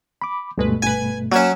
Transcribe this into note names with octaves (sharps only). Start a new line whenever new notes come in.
B5 D6
D2 G2 B2 G#3 A3 B4
G1 B4 G#5
F#3 A#3 C#4 G#6 E7